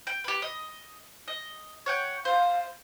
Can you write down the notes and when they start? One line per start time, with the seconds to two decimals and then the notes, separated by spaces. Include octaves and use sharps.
0.07 G5
0.24 G4 B4
0.42 D#5
1.28 D#5
1.86 C#5 F#5 G5
2.25 C5 F5